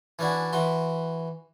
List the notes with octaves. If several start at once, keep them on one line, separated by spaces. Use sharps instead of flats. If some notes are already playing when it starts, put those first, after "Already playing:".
E3 C#4 D4 E4 F#4
E3 F#4 C6